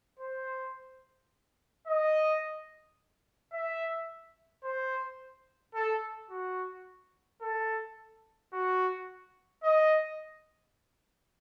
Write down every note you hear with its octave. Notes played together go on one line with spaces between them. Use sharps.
C5
D#5
E5
C5
A4
F#4
A4
F#4
D#5